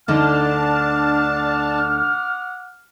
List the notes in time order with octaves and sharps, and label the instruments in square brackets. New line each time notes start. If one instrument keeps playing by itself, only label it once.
[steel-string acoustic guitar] D2 D3 D#4 [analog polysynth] D4 A5 [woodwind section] F#5 D6 F6